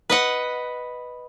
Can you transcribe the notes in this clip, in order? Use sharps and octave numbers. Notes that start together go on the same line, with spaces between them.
B4 D#5 F#5